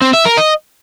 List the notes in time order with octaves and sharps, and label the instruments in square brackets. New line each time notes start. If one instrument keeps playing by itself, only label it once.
[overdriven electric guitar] C4
E5
A#4
D#5